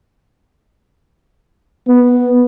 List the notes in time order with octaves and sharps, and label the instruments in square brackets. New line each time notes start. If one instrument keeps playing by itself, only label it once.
[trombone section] B3